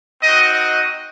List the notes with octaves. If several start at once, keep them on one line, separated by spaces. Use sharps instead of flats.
C4 D#4 F#4 D#5
D#5